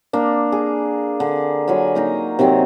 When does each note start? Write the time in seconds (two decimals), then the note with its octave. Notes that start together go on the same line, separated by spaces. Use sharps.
0.13 A#3 D4
0.52 G#4
1.20 D3
1.68 F#3 F4 G#5 B5
1.95 A#3 D#4 A#5
2.39 C3 D#3 F#3 C4